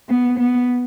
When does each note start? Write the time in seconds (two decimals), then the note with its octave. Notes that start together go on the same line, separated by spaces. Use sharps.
0.10 B3
0.39 B3